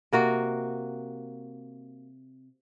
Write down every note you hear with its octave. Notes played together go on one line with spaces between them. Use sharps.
C3 A#3 F#4